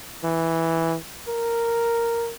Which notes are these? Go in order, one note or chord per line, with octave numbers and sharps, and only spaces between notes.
E3
A#4